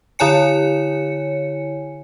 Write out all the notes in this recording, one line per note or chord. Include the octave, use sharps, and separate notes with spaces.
D3 E4 C#5 G#5 C#7